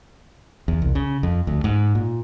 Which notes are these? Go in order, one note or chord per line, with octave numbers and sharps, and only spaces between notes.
E2
C2
C#3
F2
D2
G#2
A#2